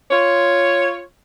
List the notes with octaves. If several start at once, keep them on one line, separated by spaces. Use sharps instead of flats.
F4 C#5